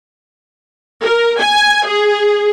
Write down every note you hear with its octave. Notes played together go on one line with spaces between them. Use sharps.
A#4
G#5
G#4